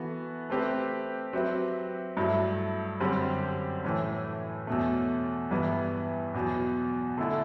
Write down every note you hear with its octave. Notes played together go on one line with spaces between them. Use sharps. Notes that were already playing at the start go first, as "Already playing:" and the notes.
Already playing: E3 B3 F#4 A4
A3 C4 G4 B4
F#3 C4 G4 B4 E5
G2 F#3 A3 E4
F#2 D3 G3 C4 G4
A2 E3 A3
E2 B2 A3
G2 E3 G3 B3 E4
E2 B2 F#3
D3 A3 E4 A4